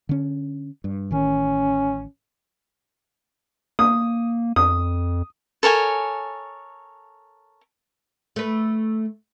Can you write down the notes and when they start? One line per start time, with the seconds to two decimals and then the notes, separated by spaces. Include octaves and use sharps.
0.09 D3 C#4
0.84 G2
1.11 A1 D#3 C#4
3.79 A#3 D#6
4.56 F2 D#6
5.63 A4 A#4 C#5 G#5
8.36 A3 B4